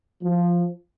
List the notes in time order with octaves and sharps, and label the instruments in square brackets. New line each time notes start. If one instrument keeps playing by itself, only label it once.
[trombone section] F3